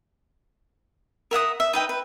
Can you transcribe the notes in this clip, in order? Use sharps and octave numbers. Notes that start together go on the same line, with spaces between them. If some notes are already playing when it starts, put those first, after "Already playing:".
A#4 E5 F#5 D#6
E5
D#4 B4 G5
B4